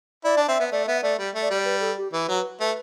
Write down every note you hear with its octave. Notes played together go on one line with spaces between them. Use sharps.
E4 D5
D4
C4 E5
B3
A3 D5
B3 E5
A3 D5
G3
A3
D5
G3
B4
A4
G4
E3 B4
F#3
A3 B4